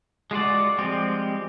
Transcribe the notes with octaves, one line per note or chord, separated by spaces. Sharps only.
G#3 F4 F#4 D5
F3 G3 G#3 C4 G4